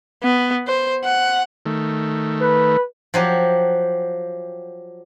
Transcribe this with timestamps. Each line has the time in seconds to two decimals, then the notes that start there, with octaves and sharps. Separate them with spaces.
0.23 B3
0.67 C5
1.04 F#5
1.66 D#3 A3
2.41 B4
3.14 F3 F#3 G4